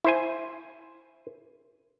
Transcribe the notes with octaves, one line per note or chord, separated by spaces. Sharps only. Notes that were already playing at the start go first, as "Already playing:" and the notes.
E4 C5 G#5